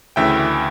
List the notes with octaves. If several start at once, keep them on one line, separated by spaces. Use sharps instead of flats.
D2 C#3 E3 E5 G5